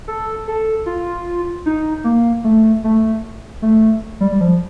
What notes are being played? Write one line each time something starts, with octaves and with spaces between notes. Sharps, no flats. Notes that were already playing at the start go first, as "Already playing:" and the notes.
A4
A4
F4
D#4
A#3
A3
A3
A3
G3
G3
F3